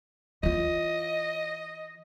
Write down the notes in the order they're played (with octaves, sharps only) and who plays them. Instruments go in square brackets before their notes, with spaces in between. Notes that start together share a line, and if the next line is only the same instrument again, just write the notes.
[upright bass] E3 F4 [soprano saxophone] D#5